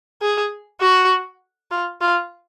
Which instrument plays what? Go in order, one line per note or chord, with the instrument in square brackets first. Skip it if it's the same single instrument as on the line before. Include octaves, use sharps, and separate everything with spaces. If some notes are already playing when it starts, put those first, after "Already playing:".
[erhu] G#4
F#4
F4
F4